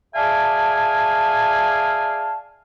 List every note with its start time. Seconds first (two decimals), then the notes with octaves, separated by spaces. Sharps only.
0.15 G#4 D5 E5 F5 G#5 A5